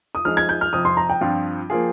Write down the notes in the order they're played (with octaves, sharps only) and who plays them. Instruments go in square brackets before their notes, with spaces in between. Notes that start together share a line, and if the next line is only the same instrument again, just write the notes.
[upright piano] D#6
[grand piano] F3 G#3 D#4 G#4 [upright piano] F6
[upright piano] G#6
G6
F6
[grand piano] F2 C3 F3 [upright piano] D#6
[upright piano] C6
A#5
G5
[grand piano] G2 F3 C4 F4
F3 A#3 F4 G#4